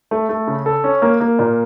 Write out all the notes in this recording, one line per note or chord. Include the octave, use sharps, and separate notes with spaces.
A3
A3
C#3
A4
C#4
A#3
A#3
A#2